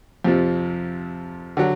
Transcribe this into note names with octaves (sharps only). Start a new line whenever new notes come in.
F2 C3 F3
D3 F#3